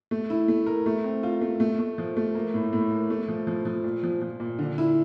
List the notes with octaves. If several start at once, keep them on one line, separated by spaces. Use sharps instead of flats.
A3
E4
A3
A#4
A3
C4
F4
A3
A3
A3
F3
A3
A#3
A2
A2
A#3
A3
F3
F3
F3
A#2
F3
F3
A#2
D3
E4